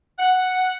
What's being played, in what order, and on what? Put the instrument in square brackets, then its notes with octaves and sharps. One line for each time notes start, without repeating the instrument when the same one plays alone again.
[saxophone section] F#5